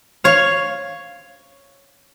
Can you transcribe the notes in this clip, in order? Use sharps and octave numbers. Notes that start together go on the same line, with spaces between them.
C#5 F5